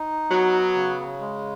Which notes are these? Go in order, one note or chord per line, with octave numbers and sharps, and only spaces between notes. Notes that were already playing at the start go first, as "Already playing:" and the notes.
Already playing: D#4
F#3 B3
C#3
G#3